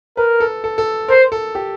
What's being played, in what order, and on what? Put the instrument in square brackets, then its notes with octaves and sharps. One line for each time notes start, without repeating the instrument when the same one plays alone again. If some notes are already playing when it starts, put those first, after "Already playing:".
[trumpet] A#4 [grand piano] B4
[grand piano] A4
A4
A4
[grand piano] A#4 [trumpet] C5
[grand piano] A4
G4